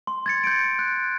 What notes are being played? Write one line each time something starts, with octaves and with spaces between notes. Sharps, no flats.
C6
G#6 A6 C#7
G6 D7
F#6